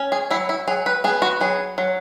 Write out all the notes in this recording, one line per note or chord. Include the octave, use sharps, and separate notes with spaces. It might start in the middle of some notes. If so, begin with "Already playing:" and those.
Already playing: C#4
G#4
F#3 E4
E4
F#3 G#4
B4
B3 G#4
F#4
F#3 G#4
F#3